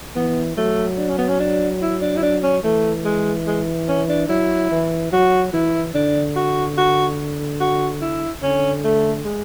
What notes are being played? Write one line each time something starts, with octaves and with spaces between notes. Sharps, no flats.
E3 B3
F#3 A3
D4
C#4
B3
C#4
D4
E4
D4
E4
D4
C#4
E3 A3
G#3
G#3
C#4
D4
F#3 E4
E3
F#3 F#4
E3 E4
D3 D4
F#4
F#4
F#4
E4
D3 C#4
A3
G#3